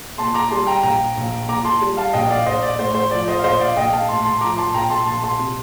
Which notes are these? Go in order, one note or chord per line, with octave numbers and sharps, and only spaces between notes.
A#2 A5 C6
A#5 D6
G3 A5 C6
G5 A#5
A#1 G5 A#5
A#1
A#2 A#5 D6
A5 C6
G3
F5 A5
A#1 D#5 G5
D5 F5
A#1 C5 D#5
D5
A2 C5
C5
F3 D5
C5 D#5
F5
A#1 C5 D#5
D5 F5
A#1 D#5 G5
F5 A5
A2 A5 C6
A5 C6
F3 A#5 D6
A5 C6
A#1 G5 A#5
A5 C6
A#1 A5 C6
A5 C6
C3